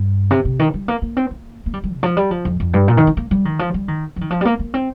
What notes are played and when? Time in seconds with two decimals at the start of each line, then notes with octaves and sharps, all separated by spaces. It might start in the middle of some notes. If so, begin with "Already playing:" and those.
Already playing: G2
0.31 C3
0.45 C3
0.59 D#3
0.74 G3
0.88 A#3
1.02 A#3
1.17 C4
1.31 A#3
1.66 A#3
1.74 G3
1.84 G3
1.93 C3
2.03 F3
2.17 G3
2.31 F3
2.45 F2
2.60 F2
2.73 G2
2.88 A#2
2.97 D#3
3.07 C4
3.17 A#3
3.31 G3
3.45 D#3
3.59 F3
3.74 G3
3.88 D#3
4.16 F3
4.21 D#3
4.30 F3
4.41 G3
4.45 A#3
4.59 A#3
4.74 C4